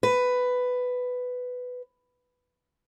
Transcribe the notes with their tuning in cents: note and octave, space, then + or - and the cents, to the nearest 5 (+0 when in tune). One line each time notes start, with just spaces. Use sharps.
B4 +10